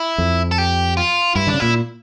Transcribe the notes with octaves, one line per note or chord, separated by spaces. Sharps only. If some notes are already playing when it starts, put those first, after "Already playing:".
Already playing: E4
F2
A4
G4
F4
G2 E4
D3 D4
C#3
A#2 E4